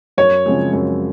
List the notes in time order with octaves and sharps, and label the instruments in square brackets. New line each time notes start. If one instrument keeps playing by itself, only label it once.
[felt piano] F#2 [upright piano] C#5
[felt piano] C#3 F3 G#3 C4
F#2